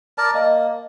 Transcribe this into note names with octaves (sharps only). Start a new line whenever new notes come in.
A#4 D5 A5
A#3 D#5